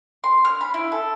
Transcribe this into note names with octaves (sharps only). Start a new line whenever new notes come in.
C6
F6
B5
E4
A4